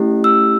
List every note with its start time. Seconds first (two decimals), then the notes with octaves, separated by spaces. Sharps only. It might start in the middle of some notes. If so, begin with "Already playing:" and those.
Already playing: A3 C#4 E4 G4
0.24 E6